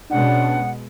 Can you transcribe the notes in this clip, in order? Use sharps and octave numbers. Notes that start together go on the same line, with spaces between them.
B2 G#3 C#4 D4 F#5